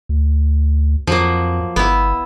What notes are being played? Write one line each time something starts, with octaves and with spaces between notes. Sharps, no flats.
D2
F2 F3 F#3 A#3
G1 B3 E4